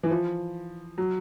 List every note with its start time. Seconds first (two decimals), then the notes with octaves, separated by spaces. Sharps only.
0.03 E3
0.11 F3
0.98 F#3